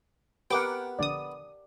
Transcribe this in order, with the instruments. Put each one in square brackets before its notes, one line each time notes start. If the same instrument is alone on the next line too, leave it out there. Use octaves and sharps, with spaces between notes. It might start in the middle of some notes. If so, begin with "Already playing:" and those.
[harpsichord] B3 [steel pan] G4 A#4 F#5 [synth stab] G5 D6
[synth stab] A#1 D3 D#6 [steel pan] D5